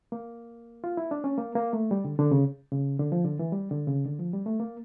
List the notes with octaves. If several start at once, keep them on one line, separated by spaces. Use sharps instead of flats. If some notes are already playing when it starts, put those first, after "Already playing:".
A#3
F4
E4
D4
C#4
A#3
A#3
A3
G3
D3
D3
C#3
C#3
D3
F3
D3
E3
G3
D3
C#3
D3
F3
G3
A3
A#3